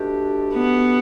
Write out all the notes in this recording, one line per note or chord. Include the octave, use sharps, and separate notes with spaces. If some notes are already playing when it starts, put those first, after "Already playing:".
Already playing: B2 A3 D4 G4
B3